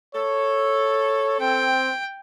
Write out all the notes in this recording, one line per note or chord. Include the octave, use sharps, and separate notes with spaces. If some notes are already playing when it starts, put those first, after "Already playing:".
A4 C#5
C4 G5